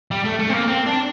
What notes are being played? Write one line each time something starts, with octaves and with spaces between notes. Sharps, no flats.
G3
A3
A3
C4
A#3
C4
D4